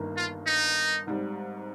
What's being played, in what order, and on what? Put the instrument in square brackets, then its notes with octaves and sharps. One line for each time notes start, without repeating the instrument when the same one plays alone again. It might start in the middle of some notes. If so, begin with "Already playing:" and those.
Already playing: [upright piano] G1 G2 D#3 A#3
[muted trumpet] F4
D#4
[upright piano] G#1 G#2 G3